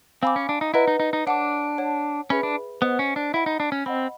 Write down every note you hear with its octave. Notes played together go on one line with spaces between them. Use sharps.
C4 F5 G#5 B5 D6
C#4
D4
D#4
E4 B4 D#5 F#5 A#5
D#4
D#4
D#4
D4 C#5 F#5 A5 D6
C#5 F#5 A5
C#4 G#4 B4 E5 G5 B5
D4
B3 C5 D#5 F#5
C#4
D4
E4 D#5 F#5 B5
D#4
D4
C#4
C4 D#5 F#5 B5